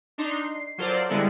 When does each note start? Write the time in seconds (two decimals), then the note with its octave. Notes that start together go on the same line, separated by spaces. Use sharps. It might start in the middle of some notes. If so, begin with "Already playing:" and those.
0.18 D4 D#4 C6
0.40 C7
0.78 F#3 F4 A4 A#4 C5 D5
1.10 D3 G3 G#3 B3 E4 A4